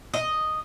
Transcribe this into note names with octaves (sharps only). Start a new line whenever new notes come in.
D#5